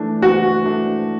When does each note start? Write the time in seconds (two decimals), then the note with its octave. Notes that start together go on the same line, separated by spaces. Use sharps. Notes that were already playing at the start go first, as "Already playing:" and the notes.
Already playing: E3 A3 D4
0.22 E3 F#4
0.66 A3 D4